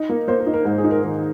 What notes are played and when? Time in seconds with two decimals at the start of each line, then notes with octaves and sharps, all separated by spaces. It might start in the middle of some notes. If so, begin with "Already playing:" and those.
Already playing: D#4
0.09 A#3
0.28 A#3 C5
0.40 A#4
0.46 D#4
0.54 A#4
0.65 G#2 A#4
0.78 G#4
0.84 D#4
0.91 A#4
1.03 D#3 A#4